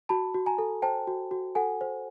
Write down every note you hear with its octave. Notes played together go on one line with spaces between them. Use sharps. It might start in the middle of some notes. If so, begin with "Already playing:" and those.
F#4 A5 B5
F#4
G#5 A#5
A4
C5 G5 A5
F#4
F#4
A4 F#5 G#5
C5